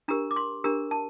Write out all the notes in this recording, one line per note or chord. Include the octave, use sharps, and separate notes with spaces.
D4 G4 A#4 A#5
D6
C6
D4 G4 A#4 A#5
A5